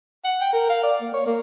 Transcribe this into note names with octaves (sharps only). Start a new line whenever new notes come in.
F#5
G5
A#4
F5
D5
A#3
C#5
A#3